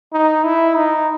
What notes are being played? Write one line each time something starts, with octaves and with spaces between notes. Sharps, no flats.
D#4
E4
D#4